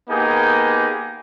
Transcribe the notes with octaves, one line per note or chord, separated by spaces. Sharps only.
A#3 B3 D#4 G4 G#4